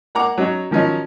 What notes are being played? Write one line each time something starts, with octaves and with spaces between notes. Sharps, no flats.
A#3 F#5 A#5 D6
F#3 C#4 D#4
D#3 F3 F#3 C#4 D#4